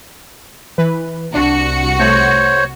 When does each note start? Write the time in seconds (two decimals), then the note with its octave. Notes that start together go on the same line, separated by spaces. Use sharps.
0.78 E3 B4
1.34 C2 D4 F#4 C#7
2.00 A3 C5 C#5